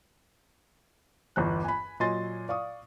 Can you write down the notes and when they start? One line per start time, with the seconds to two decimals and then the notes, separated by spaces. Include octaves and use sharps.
1.36 G1 E2 F#6
1.64 G#5 B5
2.00 A#2 F#3 D#5 G#5 C6 A6
2.49 D5 F5 C#6 D#6